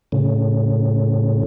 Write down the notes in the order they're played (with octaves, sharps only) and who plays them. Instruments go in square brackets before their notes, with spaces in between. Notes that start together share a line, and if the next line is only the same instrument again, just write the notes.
[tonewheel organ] A2 C#3